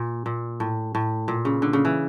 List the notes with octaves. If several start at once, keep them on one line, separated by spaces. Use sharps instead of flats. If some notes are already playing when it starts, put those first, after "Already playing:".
Already playing: A#2
A#2
A2
A2
A#2
C#3
D3
C#3
E3